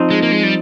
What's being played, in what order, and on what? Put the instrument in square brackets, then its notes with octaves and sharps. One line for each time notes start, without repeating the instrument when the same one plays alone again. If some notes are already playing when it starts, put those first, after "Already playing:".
Already playing: [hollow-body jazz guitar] F3 C4 D#4
[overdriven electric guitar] G#3
A#3
G#3
G3